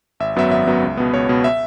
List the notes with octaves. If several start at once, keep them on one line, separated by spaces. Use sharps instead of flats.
G#1 E5
F#2 F#3 B3 E5
G#1 E5
F#2 F#3 B3
C#2
B2 B3
C#2 C#5
B2 B3
E5